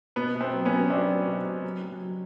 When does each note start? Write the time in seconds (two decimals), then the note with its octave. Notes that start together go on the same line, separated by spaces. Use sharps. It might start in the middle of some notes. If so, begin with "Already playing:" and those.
0.16 B2 B3
0.35 B2
0.41 C4
0.53 F#3
0.65 B3 C#4
0.71 F#3
0.90 F#3 C4 D4
1.08 F#3
1.27 B2
1.45 B2
1.64 F#3
1.82 F#3
2.01 F#3